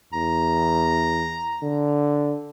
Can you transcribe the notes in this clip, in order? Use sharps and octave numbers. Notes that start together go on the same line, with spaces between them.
E2 A#5
D3